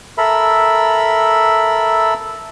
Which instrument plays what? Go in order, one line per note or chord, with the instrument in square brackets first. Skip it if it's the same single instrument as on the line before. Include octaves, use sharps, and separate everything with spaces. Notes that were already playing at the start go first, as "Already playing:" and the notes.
[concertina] A4 A#4 E5 B5